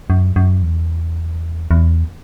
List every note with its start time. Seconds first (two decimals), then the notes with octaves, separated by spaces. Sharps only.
0.10 F#2
0.36 F#2
0.63 E2
1.71 E2